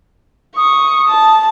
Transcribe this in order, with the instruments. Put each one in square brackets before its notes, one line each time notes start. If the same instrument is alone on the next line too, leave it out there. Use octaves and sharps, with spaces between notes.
[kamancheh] C#6 [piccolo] D#6
[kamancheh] A5